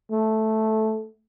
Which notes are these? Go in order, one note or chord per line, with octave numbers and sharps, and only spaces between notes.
A3